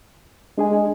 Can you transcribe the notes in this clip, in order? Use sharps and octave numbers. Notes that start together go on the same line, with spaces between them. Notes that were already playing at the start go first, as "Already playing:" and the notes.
G#3 D4 G#4 G#5